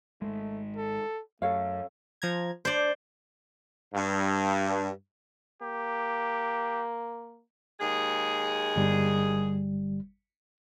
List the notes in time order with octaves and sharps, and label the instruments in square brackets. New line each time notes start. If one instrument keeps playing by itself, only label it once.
[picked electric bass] G#1 D#2 G#3 [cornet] A3
[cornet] A4
[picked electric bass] F#2 [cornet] A3 [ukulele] A4 C#5 F5
[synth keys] F3 A#5 G#6
[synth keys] D4 [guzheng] C5 D5
[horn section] G2
[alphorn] A#3 [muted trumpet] G4
[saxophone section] D#2 G#3 G#4
[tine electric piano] G1 G3